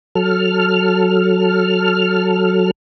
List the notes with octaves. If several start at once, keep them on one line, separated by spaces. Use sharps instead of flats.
F#3 A4 F6